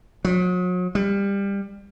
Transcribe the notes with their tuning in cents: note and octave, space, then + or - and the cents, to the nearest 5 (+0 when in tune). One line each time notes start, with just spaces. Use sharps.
F#3 -40
G3 +25